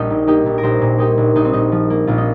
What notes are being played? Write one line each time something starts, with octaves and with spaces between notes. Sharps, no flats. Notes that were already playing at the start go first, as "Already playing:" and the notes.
Already playing: A#1 D#4 G4
A#2
A#3 D#4 G4
A#1
A#4
A#1 G4 C5
A#2
A#3 D#4 G4
A#1
A#1 D#4
C4
A#2 D#4
F3
A#3
A#1 F4
D#4